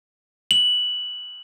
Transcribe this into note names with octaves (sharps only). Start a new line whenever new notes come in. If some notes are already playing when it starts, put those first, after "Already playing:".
F#7